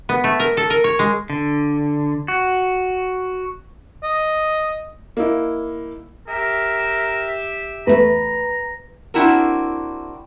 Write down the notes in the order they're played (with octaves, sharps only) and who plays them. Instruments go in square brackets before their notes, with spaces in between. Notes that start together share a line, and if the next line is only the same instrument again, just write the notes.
[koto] B3
A3
A#4
A4
A#4
C#5
G#3
[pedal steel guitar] D3
F#4
[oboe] D#5
[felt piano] A#3 D#4 E4
[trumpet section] G4 E5 [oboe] A#4
[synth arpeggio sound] E2 A3 [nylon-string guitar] B4 [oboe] A#5
[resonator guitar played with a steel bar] C4 D4 E4 F#4 A#4